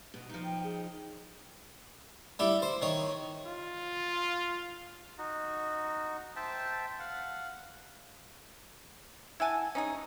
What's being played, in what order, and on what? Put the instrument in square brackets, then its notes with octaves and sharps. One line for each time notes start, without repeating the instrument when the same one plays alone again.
[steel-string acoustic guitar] B2
F3 D#4
[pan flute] G5
G#4
[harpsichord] G3 E4 G4
C5
D#3 C#5
[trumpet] F4
[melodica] D#4 F#4
C5 E5 G5 A5
F5 F#5
[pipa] E4 F#5 G#5 A5
C#4 D#4 G#4